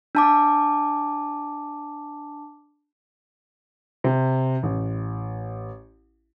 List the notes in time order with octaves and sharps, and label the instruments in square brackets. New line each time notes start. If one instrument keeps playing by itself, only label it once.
[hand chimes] D4 A5 D6
[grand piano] C3
A1